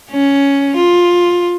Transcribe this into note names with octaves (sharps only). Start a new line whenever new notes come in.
C#4
F4